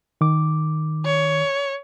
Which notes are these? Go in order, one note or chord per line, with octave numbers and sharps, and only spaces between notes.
D#3 D6
C#5